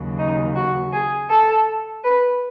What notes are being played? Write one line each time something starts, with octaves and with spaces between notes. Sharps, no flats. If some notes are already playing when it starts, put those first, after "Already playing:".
Already playing: D#2 C#3 F#3
D#4
F#4
G#4
A4
B4